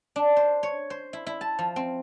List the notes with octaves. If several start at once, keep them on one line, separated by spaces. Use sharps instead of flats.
D4
C5
C#5
C5
E4
E4
A5
F3
C4